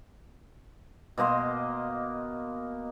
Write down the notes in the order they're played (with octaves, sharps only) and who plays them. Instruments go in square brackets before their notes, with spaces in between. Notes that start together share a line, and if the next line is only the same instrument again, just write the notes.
[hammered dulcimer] B2 A#3 D#5 C6